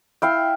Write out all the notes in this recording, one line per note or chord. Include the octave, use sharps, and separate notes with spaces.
E4 F5 G5